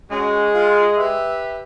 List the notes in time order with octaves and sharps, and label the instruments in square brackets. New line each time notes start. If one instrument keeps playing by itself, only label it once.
[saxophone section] G#3 [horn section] C#4 F#4
[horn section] F4
G4 B4 E5